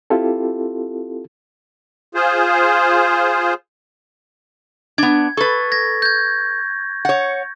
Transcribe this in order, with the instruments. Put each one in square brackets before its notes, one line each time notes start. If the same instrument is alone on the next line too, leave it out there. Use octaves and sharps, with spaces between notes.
[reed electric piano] C4 E4 F4 G4 A4
[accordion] F4 G#4 C5
[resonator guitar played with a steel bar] B3 D4 [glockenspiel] G#6
[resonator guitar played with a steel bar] A4 B4 [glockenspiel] C#6 A6
[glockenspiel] G#6 A#6
G6 G#6
[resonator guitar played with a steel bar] C#5 F#5